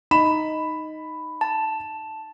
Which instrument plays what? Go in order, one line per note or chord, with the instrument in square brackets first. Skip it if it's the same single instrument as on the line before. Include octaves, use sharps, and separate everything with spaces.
[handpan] D#4 [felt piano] B5 E7
[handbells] A5